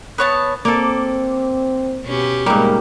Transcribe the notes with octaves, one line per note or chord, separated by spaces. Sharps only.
B3 C#5 A5
A#3 C4 A4 D5
B2 C#4 G4
G#2 G3 A#3 A#4